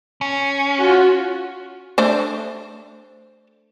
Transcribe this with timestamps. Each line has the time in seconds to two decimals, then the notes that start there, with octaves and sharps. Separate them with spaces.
0.21 C#4
0.80 F4 F#4
1.98 A3 D4 C5